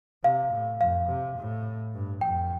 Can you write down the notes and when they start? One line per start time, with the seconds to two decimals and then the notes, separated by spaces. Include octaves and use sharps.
0.24 C3 F5
0.53 A2
0.81 F2 F5
1.09 C3
1.38 A2
1.94 G2
2.21 F2 G5